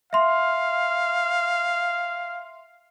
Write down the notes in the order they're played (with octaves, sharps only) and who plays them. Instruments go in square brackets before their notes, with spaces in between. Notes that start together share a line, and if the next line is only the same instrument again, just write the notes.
[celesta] E5 C6 [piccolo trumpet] F5